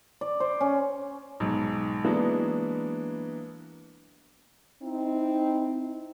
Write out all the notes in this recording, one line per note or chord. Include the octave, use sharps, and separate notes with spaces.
D5
C5
C#4
B1 G#2
E3 F#3 G#3 A#3 B3 D4
C4 D#4 E4